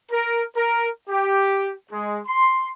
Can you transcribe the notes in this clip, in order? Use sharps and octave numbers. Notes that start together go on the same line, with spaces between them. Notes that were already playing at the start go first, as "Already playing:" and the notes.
A#4
A#4
G4
G#3
C6